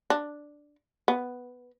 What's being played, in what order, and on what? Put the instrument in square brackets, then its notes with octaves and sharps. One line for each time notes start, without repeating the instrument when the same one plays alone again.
[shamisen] D4
B3